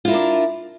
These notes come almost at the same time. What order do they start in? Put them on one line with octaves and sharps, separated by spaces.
F4 E4 A#4 D4